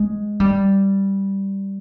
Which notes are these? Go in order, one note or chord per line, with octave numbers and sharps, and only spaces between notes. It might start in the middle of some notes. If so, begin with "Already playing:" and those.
Already playing: G#3
G3